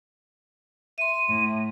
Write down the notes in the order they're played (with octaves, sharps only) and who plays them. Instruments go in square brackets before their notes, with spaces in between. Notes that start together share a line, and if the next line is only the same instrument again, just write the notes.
[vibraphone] E5 C6 [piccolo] D#7
[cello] A2